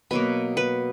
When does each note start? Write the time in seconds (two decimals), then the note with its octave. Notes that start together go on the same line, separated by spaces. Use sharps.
0.11 B2 F#3 A#3 B4
0.57 B4